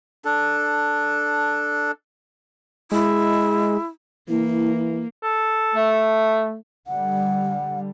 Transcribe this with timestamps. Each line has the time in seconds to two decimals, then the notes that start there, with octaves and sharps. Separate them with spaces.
0.25 D4 A4
2.92 G#3 E4
4.29 E3 A#3 E4
5.24 A4
5.74 A3
6.87 D3 G3 F#5